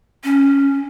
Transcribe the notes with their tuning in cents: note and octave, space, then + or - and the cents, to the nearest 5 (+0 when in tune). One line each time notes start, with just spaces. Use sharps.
C#4 +0